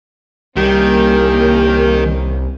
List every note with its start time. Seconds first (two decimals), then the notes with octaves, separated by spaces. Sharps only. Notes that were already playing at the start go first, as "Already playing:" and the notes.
0.57 C2 D#3 G3 A#3 C#4 G4